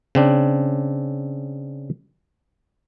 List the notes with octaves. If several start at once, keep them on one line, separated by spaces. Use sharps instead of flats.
C#3 C4 D4